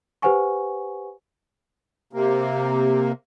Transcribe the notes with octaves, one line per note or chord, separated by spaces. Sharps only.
G4 B4 C5 F#5 G#5 C#6
C3 A#3